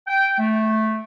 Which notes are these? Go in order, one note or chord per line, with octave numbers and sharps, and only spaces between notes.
G5
A3